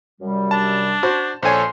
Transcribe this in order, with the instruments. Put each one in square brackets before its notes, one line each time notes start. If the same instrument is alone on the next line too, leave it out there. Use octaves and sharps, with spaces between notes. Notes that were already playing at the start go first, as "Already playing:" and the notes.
[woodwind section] F#2 C3 G3
[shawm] D4 [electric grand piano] A5
[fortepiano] F#4 C5
[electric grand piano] A#1 A4 C#5 [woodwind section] D4 C6 [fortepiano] C5 G#5